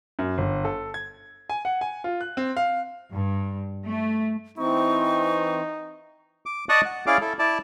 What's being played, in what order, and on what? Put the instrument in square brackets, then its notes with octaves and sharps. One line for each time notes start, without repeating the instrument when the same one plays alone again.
[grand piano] F#2
G1
A4
G#6
G#5
F#5
G#5
F4
F#6
C4
F5
[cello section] G2
A3
[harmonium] E3 C4 [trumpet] D#4 [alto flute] C#6
[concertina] D6
D5 D#5 A5 C#6 D#6 F#6
F#5
C#4 E4 G#4 D5 F5 D6
E4 A4
E4 D5 A5